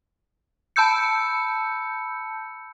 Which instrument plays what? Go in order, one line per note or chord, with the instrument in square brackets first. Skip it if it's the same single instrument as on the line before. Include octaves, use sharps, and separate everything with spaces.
[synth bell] A5 B5 E6 G6 C#7